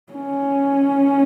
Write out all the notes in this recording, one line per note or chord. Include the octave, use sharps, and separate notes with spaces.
C#4